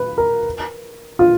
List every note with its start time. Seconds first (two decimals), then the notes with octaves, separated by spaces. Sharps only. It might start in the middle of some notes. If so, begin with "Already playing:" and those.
Already playing: B4
0.18 A#4
1.19 F4